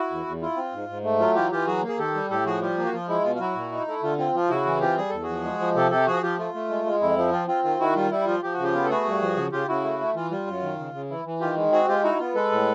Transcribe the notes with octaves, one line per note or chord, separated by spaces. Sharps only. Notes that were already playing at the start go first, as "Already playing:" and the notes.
Already playing: E4 F#4
E2
E2
E4 F4
C4
G#2
G#2
A3
F#3 F4
E3 F4 G4
E3 F4 G4
F#3 F#4 G#4
A#3
G#4
D#3 G4 A4
G3
A2 G4 A4
F3 F#4 G#4
G3 F4 G4
A#3
F#4
F3 F4
G#3 E4
B2 F4
F4
F#3 E4 F#4
A#2
D#4
A3 E4
D3 F4
C4 F4
F3 F4
C#3 E4 F#4
E3
C4 F4 G4
G3 G#4
E2 A4
F#4 G#4
F3
G#3
F3
C3 G4 A4
C3 G4 A4
F3 F#4 G#4
F3 F4 G4
A3 F4
A3
G#3
G#3
F2 E4
F3
C4 F4
C4 F4
D#3 F4
D#3 E4 F#4
G3 F4
G3 E4
F3 F4
F3 G4
F#4
C#3
F4 G4
B3
A4
A3 F#4 G#4
G2
F3
C#3
C#3 F4 G4
C#3 E4 F#4
A3
A3
E3 F4
G3 F4
F#2
D#3
C#3
C#3
E3 E4
E3
D#3 F4 G4
G#3
C4 F#4 G#4
G#3 F4 G4
D#4 E4 F#4
B3 F4
G#3 A4 B4
A2